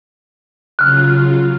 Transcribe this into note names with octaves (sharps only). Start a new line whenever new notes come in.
C#3 F#3 F4 F6 F#6